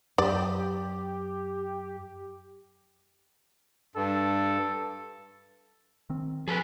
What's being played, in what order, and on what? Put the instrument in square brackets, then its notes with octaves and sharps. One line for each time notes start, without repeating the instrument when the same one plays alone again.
[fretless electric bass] F#2 [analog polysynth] G4 [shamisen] D5
[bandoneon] G2 [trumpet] A4
[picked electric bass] D#3 C4
[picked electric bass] F3 [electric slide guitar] G#4 A4 B4